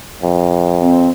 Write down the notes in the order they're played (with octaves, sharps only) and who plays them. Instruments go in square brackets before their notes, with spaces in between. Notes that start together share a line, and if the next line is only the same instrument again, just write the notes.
[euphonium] F2
[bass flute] C4